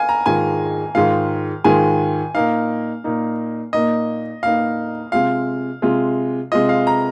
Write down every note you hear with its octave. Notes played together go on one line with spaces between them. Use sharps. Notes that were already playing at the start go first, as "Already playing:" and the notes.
Already playing: F5 G#5
A#5
G#2 D#3 G#3 F4 G#5
G#2 D#3 G#3 F4 F5
G#2 D#3 G#3 F4 G#5
A#2 A#3 D#4 F5
A#2 A#3 D#4
A#2 A#3 D#4 D#5
A#2 A#3 D#4 F5
C3 G#3 F4 F5
C3 G#3 F4
C3 G#3 F4 D#5
F5
A#5